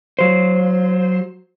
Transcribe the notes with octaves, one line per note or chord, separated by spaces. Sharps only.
F#3 C5